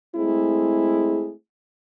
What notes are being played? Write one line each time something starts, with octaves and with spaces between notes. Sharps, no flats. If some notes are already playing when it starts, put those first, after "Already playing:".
G#3 A3 C4 E4 G#4